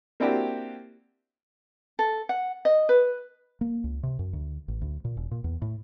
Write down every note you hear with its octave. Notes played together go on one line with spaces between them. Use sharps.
A#3 C4 D4 E4 F#4 G4
A4
F#5
D#5
B4
A#3
C#2
C3
F#2
D2
A1
D2
A#2
E1
A#2
E2
A2